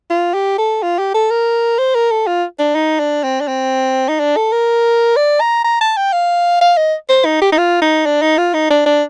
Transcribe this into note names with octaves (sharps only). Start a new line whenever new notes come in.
F4
G4
A4
F4
G4
A4
A#4
C5
A#4
A4
F4
D4
D#4
D4
C4
D4
C4
D#4
D4
A4
A#4
D5
A#5
A#5
A5
G5
F5
F5
D#5
C5
D#4
G4
D#4
F4
D#4
D4
D#4
F4
D#4
D4
D4